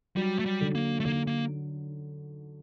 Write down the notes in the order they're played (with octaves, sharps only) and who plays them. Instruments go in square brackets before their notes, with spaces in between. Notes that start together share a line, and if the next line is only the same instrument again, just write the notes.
[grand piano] F#3 [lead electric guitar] G3
[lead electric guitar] A3
G3
[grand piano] D3
[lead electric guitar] A#3
A3
[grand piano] D3 [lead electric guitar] A#3
[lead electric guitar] A#3